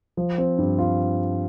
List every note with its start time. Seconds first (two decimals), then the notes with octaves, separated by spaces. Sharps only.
0.17 F3
0.38 C4
0.58 G2
0.79 F4